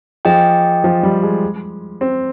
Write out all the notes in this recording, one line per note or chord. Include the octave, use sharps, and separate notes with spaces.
F3 G#4 D#5 G5
F3
G3
G#3
C4